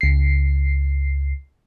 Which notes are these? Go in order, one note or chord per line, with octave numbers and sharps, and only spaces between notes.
C#2 C7